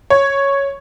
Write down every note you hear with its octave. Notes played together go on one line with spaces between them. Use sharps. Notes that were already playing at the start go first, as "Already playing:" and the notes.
C#5